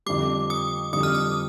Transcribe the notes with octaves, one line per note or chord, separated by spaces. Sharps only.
F2 D3 G3 D6
D#6
F2 D3 G3 D#6
F6
D#6